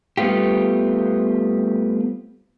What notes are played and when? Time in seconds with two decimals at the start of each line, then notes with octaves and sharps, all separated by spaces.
0.17 G3 A3 B3 C4 F4 G4